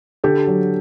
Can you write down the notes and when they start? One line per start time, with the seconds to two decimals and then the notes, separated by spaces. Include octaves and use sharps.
0.24 D3 G4 A4
0.47 F#3